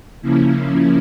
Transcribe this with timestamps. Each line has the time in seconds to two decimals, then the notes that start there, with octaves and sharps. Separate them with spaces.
0.22 C#3 F3 A#3 C#4 E4